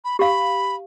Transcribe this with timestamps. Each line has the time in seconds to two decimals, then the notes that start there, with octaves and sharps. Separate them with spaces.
0.05 B5
0.19 G4 F5 B5